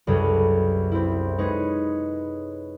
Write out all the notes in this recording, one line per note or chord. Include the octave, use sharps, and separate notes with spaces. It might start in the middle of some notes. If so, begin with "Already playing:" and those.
C2 F#2 G#4 A4 B4
C4 E4
G#3 D#4 G#4 B4 C#5